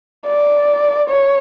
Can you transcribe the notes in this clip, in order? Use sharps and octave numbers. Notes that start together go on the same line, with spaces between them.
D5
C#5